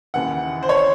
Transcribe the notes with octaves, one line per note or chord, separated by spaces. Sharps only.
D#2 C#3 E3 F#5
C5
C#5